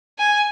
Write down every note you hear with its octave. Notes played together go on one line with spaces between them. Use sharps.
G#5